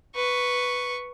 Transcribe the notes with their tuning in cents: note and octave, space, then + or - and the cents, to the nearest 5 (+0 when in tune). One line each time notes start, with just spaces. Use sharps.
B4 +0 C#6 +0